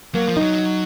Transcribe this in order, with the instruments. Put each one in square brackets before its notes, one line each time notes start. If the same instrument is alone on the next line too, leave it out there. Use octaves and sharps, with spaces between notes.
[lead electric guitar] F#3 [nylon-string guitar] A#3
[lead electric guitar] F3
[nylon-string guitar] D#4
[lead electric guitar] F#3